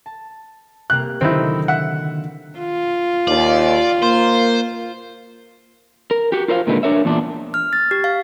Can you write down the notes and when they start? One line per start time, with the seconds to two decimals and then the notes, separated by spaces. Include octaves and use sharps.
0.06 A5
0.90 C3 G3 A#3 F#6
1.21 D3 D#3 F#3 C4 D#4 E4
1.68 E5 F#5
2.59 F4
3.27 D#2 D5
4.02 A#3 C5
6.11 A#4
6.32 F#4 G4
6.48 F4 A#4 C5 E5 F5
6.67 A#2 D3 D#3 G#3 A3 B3
6.83 D4 A#4 C#5 E5
7.05 E2 A#2 D4
7.54 F6
7.73 A6
7.91 G4
8.04 F5